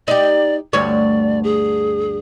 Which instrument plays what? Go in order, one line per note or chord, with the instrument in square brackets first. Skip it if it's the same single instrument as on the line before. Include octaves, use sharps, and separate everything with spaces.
[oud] D#4 G4 [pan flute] D5
[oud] D2 G2 C#5 [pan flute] D5
[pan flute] G#4